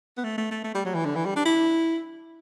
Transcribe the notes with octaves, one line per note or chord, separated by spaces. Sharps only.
B3
A3
A3
A3
A3
G3
F#3
E3
D3
E3
G3
D4
E4